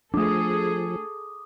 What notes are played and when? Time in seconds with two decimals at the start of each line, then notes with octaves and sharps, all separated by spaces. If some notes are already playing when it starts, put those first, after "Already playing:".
0.14 F3 A3 D4 G#4 A4 D6 D#6